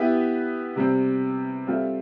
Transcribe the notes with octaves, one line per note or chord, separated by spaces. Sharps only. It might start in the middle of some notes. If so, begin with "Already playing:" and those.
Already playing: B3 E4 G4 B4 E5
C3 G3 C4
G3 C4 F4 A4 E5